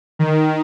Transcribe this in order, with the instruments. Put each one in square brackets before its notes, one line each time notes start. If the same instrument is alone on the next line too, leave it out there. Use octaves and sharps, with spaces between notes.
[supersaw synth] D#3